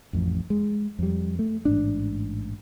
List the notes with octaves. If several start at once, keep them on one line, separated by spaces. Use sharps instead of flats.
A1 F2
G#3
F2 G3
A3
A1 G#2 D4